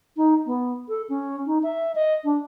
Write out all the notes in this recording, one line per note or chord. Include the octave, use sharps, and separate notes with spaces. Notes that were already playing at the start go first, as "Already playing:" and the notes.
D#4
B3
A4
C#4
D#4
E5
D#5
D4